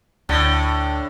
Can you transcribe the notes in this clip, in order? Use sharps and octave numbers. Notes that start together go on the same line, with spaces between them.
D2 A2 D3